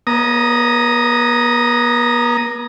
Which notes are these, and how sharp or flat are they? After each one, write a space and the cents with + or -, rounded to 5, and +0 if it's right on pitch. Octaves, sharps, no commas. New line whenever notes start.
B3 -45 A#5 +0 D#6 +0